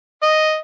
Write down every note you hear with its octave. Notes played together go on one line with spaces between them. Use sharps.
D#5